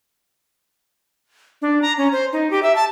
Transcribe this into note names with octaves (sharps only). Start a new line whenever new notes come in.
D4
A#5
C#4
C5
D#4
G4
E5
A5